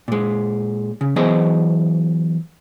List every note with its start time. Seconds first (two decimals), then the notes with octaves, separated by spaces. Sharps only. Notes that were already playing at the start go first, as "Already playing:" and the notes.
0.08 A#2 G#3
1.01 C#3
1.16 E3 F#3 B3 G#4 C5 D#5